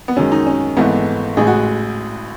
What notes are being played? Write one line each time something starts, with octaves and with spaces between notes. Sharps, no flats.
B3
F#2 D#3 G#3 C#4
D#4
C#4
G#1 G#2 E3 A3 B3
A1 A2 G#3 G#4
F#4